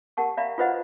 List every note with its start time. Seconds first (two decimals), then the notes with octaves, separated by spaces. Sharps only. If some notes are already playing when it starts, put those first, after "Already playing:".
0.17 G4 A#4 F#5 A5 C#6
0.37 D5 E5 F5 A#5 B5
0.58 F4 F#4 B4 C5 D#5 F#5